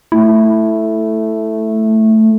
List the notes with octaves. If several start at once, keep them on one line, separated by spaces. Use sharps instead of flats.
A3 E4